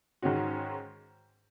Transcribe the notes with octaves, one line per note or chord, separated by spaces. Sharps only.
G#2 D#3 G#3 C#4 F#4